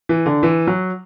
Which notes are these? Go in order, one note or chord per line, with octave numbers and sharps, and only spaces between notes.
E3
D3
E3
F#3